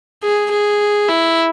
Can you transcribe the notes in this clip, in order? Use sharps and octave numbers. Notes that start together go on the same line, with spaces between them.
G#4
G#4
E4